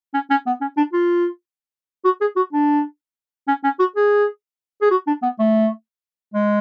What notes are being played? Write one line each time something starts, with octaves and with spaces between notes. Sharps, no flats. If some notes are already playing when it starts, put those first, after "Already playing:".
C#4
C#4
B3
C#4
D4
F4
F#4
G#4
F#4
D4
C#4
C#4
F#4
G#4
G#4
F#4
D4
B3
A3
G#3